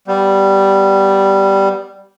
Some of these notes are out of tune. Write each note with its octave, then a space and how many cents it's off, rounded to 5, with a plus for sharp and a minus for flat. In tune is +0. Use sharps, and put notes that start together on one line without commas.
G3 -5 B3 +0